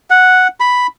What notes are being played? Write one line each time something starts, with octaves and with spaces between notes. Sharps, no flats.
F#5
B5